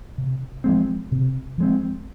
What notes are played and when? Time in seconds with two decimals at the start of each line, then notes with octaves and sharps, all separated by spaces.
0.18 C3
0.64 F3 G#3 C4
1.11 C3
1.58 F3 G#3 C4